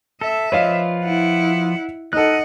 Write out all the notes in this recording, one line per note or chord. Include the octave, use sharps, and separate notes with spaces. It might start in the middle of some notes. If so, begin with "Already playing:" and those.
A4 E5
F3 F4 B4 C#5 D#5 F5
E4 F#5
D#4 A4 D#5 F#5 F#6